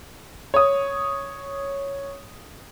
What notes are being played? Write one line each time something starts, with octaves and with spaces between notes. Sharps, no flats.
C#5 D#6